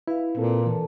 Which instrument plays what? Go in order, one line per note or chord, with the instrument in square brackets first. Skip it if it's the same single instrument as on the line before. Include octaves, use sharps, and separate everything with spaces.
[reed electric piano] E4 [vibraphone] B4 F5
[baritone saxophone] A#2 [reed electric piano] C4 A4
[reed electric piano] E3 [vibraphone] A4 A5